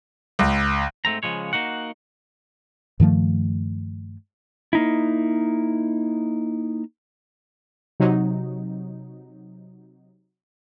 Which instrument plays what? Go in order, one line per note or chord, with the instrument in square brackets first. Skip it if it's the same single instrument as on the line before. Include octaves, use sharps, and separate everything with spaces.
[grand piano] C#2
[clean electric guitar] G#2 A3 C4 A#5
C#3 F3 G#3 C#5
A#3 D#4 F#4 F#5
[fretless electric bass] G2 D#3 F3 A3
[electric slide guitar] A#3 D#4 E4
[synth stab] C3 F#3 D#4